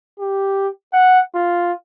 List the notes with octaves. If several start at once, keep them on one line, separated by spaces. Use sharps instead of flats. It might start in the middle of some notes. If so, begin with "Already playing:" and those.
G4
F#5
F4